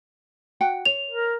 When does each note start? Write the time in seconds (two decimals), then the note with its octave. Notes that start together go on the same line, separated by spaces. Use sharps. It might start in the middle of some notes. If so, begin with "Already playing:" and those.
0.61 F#4 F#5 G5
0.86 C#5 F7
1.11 A#4